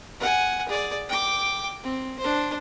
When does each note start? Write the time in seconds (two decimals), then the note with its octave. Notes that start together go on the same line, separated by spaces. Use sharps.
0.20 F#5 G#5
0.68 G#4 D5
1.09 G5 D6
1.83 C4
2.19 D4 C5